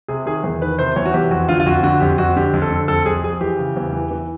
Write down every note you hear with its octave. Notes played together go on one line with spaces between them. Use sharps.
C3 G#4
D#3 G#4
E2
D#3 B4
C3 C5
E2 C#5
F#4
E2 G4
F2 F#4
D3 F4
F4
F2 F#4
D3 F#4
F2 G4
F2 F#4
D3 G4
F2
A4
D3
F2 A4
F2 G#4
F2 G#4
E3 G4
C#3
E2
E3
E3